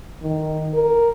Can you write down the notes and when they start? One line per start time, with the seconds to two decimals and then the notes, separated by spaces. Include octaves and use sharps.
0.22 D#3
0.74 A#4